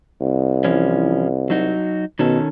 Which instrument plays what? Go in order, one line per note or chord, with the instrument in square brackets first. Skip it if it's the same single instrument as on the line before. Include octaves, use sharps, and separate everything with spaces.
[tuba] C2
[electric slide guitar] E3 F3 C#4
F#3 D#4 F#4
[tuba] B2 [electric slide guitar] D#3 C#4 A4